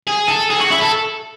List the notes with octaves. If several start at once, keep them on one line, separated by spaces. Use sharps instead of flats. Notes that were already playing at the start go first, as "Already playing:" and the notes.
G#4
A4
G#4
F#4
E4
A4